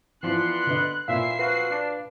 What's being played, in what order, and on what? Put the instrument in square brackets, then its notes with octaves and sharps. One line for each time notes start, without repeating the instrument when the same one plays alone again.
[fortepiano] E3 F3 [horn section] B3 D5 C6 [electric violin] F#6
[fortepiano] D3 B4 D#5
[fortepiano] A#2 [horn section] E3 C5 E5 [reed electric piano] F5 [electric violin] C7
[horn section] F3 C4 F#4 [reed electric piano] B4 F5
[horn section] D4